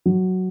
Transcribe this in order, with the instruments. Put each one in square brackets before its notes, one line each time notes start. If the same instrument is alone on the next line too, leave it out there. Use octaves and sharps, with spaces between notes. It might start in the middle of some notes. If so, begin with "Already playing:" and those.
[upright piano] F#3